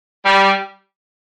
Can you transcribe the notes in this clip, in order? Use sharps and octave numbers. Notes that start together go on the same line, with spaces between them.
G3